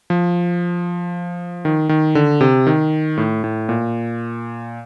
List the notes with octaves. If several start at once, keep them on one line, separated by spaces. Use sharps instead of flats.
F3
D#3
D#3
D3
C3
D#3
A2
A2
A#2